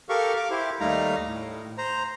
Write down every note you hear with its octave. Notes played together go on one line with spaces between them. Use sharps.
G4 A4 A#4 F5 C#6
F5 D6
E4 G4 C5
D#2 G3 A3 D#4 F5 A#5
A2
C5 A#5